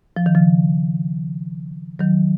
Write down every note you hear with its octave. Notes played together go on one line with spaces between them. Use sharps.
F3
D#3
C#3 F3
D#3 F#3